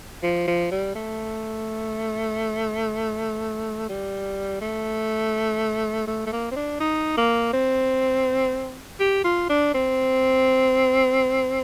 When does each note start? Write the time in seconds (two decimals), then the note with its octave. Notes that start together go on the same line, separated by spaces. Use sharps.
0.23 F3
0.47 F3
0.71 G3
0.95 A3
3.89 G3
4.61 A3
6.07 A3
6.26 A3
6.32 A#3
6.51 C4
6.56 D4
6.80 D#4
7.17 A#3
7.53 C4
9.00 G4
9.24 F4
9.50 D4
9.74 C4